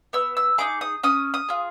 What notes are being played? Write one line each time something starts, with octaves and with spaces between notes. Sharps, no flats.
B3 E6
E6
D#4 G#4 D6
D#6
C#4 D#6
D#6
F4 G#4